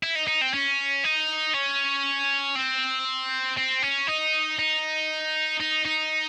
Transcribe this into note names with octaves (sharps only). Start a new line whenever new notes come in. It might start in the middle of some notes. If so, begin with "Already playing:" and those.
E4
D#4
D#4
C4
C#4
D#4
C#4
C4
C4
C#4
D#4
D#4
D#4
D#4